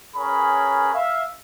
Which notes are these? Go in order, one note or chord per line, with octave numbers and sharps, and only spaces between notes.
C#4 G#4 A#4 B4 C#5 B5
E5 F5